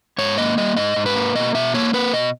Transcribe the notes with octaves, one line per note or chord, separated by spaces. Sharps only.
G#2 C#5
A#3 D#5
G3 D#5
G#2 D#5
G#2
B4
A#3
B2 D#5
B2 E5
A#3 C#5
A#3 B4
B2 D#5